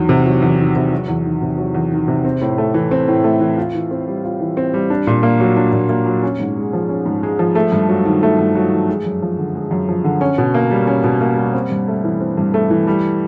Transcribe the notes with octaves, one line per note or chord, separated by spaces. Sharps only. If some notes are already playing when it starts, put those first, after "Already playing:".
Already playing: E2 D#3 F#3
C3
F#3
E2
D#3
C3
F#3
E2
D#3
C3
F#3
E2
D#3
C3
C4
A2
A3
E3
C4
A2
A3
E3
F4
E3
C4
G3
F4
E3
C4
G3
D4
A#2
A#3
F#3
D4
A#2
A#3
F#3
C#4
G#2
G#3
F3
C#4
G#2
G#3
F3
A3
G2
F#3
D#3
A3
G2
F#3
D#3
G#3
F#2
F3
D3
G#3
F#2
F3
D3
C#4
B2
A#3
G3
C#4
B2
A#3
G3
C4
G2
A3
E3
C4
G2
A3
E3
G3